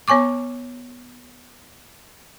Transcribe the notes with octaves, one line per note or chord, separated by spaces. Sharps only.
B3 C#5 G#5 C#6 D6